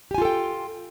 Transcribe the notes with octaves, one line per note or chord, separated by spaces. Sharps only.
F4 G4 A4 G5 G#5